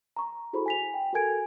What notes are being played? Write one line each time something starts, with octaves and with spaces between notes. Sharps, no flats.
A#5 C#6
E4 F#4 G#4 A4 C5 B5
G#5 B6 F7
G5
F#4 A4 A#4 G#5 G#6 D7